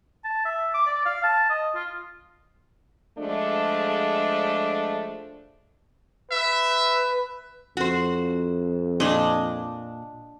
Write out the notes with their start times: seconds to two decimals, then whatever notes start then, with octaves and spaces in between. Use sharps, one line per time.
0.24 A5
0.45 E5
0.74 D6
0.86 D5
1.05 F5
1.23 A5
1.50 D#5
1.75 F4
3.18 F3 G#3 A3 D4
6.31 B4 E5
7.77 F2 F#4 C5
9.00 A#2 D4 D#5